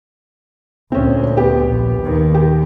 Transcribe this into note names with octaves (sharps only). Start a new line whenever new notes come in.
D2 A#2 C4 C#4
B3 G4
A#1
D#2 D#3
G4